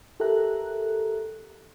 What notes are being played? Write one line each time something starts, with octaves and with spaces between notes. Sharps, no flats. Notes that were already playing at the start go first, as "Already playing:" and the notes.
G4 A4 A#4 E5 A#5 F#6